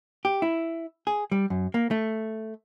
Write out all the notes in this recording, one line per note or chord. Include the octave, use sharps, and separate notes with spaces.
G4
E4
G#4
G3
F#2
A#3
A3